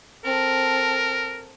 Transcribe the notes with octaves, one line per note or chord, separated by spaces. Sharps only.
C4 A4 A#4